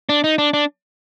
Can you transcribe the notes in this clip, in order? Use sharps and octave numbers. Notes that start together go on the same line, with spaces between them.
D4
D#4
D4
D4